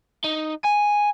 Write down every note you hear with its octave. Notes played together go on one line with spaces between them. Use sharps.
D#4
G#5